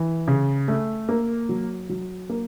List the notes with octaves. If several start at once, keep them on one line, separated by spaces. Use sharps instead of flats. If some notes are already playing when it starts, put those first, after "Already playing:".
Already playing: E3
C#3
A3
A#3
F#3
F#3
A#3